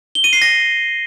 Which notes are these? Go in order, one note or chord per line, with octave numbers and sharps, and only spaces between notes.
G7
D#7
C7
A#6